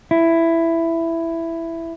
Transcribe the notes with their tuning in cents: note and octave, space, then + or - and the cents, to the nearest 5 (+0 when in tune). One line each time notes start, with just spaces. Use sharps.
E4 +10